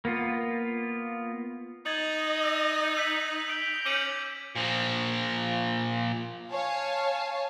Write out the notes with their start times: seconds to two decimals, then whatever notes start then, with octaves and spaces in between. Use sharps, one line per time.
0.05 A#3 B3 F4
1.86 D#4 D#5 G#6 A6 F#7
2.43 E6 A#6
2.97 E6 B6 F#7
3.48 G6 B6 D7 F7
3.85 C#4 D6 D#7 F#7
4.56 A#2 F3
6.51 C#5 F5 G#5 A5